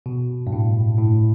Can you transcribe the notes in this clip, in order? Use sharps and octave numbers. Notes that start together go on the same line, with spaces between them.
B2
G2
A2
A2